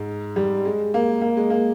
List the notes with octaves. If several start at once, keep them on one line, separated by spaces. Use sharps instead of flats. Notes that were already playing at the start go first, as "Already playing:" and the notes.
Already playing: G#2
G3
G#3
A#3
A#3
G#3
A#3